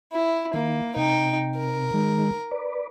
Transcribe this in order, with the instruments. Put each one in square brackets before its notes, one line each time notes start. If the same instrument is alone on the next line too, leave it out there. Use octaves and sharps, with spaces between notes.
[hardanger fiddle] E4
[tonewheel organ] D#3 [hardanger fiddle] A#3
[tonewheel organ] C3 [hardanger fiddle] D#4 G5
[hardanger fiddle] A#4
[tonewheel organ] D#3 G#3
B4 D5